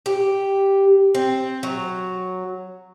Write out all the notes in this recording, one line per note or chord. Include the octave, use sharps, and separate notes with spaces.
G4
C4
F#3